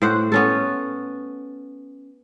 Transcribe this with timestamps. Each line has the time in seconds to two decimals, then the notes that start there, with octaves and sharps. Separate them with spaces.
0.02 A2 C5 F#5
0.32 B3 C#4 A4